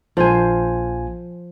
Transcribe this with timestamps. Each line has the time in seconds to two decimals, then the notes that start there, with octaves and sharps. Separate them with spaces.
0.17 A#1 F3 F4 C5 G#5